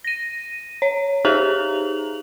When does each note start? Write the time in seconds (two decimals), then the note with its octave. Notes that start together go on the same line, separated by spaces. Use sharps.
0.04 A#6 D#7
0.82 C#5
1.25 D#4 G4 G#4 A#5 F7 F#7